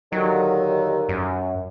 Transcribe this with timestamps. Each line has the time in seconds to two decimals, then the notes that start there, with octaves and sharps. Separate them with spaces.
0.12 D#2 D3 D#3 F#3
1.09 F#2